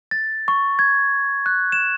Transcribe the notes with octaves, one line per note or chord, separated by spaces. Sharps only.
A6
C#6
G#6
F#6
E7